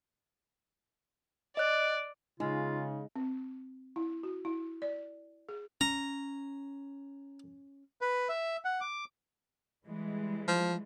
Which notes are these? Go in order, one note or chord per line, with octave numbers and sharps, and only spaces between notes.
D5 D#5 F#6
C#3 G#3 D#4 F4
C4
E4
F#4
E4
D5
G#4
C#4 A#5
B4
E5
F#5
D6
E3 G3 G#3
F3